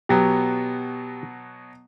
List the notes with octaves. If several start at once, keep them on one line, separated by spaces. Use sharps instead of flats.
B2 F#3 B3 G4